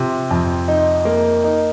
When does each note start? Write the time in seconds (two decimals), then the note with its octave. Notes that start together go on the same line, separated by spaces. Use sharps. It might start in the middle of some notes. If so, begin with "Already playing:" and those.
Already playing: C3 F3
0.31 F2
0.68 D#4
1.05 A#3
1.44 D#4